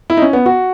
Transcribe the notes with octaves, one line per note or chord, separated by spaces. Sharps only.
E4
D#4
C#4
B3
F#4